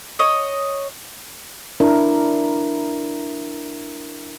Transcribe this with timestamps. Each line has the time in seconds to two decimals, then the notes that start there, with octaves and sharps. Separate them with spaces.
0.19 C#5 D#5
1.80 D4 E4 A#4